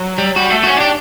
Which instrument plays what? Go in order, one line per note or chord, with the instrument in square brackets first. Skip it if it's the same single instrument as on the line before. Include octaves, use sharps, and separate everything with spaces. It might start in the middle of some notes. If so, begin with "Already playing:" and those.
Already playing: [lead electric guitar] F#3
[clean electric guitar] G3
[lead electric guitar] G3 [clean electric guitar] F#4
[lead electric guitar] A3
[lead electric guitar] C#4 [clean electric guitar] F#4
[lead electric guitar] D4 [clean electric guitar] G4